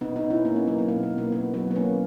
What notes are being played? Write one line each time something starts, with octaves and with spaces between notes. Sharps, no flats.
B2 B3 D#4
B3 D#4
B2
C#4 E4
A#3 C#4
B3
F#3 A#3
A#3
B2 B3
B3
B2
A#3
A#3 B3
F#3 B3
B3
D#3 A#3 C#4